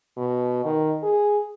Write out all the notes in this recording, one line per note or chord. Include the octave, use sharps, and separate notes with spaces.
B2
D#3
G#4